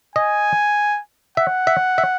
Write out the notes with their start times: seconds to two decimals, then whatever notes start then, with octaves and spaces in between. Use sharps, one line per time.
0.16 D#5 G#5
1.37 E5 F#5
1.67 E5
1.98 E5